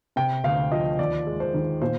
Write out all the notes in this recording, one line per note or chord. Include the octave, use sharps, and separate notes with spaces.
C3 G5
D2 F5
F3 D#5
D#2 D5
G#3
C5
D#3
A#2 C5